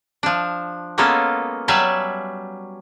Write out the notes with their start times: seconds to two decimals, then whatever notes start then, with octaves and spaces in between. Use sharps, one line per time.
0.23 F3 D4
0.98 G#3 A#3 B3 C#4 F4 A4
1.68 F#3 G3 E5 F5 G#5 A5